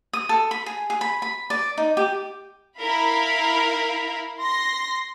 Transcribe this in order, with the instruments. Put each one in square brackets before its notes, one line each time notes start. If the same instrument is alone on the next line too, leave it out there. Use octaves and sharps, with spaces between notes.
[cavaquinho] D#6
A4
B5
G#4
G#4
B5
B5
D5
D#4
G4
[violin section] E4 A#4 F5 B5
C6 A#6